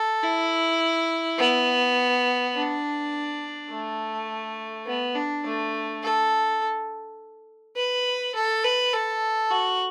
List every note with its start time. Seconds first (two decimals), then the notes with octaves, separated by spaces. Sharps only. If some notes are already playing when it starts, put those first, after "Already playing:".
Already playing: A4
0.23 E4
1.39 B3
2.55 D4
3.71 A3
4.86 B3
5.15 D4
5.45 A3
6.03 A4
7.76 B4
8.35 A4
8.64 B4
8.94 A4
9.51 F#4